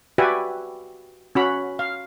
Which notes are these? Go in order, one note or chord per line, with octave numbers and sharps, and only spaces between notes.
F#4 G4 B4 D5 E5 G#5
C#4 F#4 B5
F5